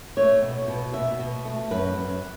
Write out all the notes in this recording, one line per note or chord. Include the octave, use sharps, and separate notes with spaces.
A3 C#5
B2
B2
B2 E5
B2
A3
F#2 B4
F#2